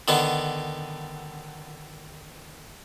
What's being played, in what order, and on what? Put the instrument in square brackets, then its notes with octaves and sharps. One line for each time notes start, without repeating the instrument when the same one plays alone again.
[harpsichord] D3 D#3 B3 D#4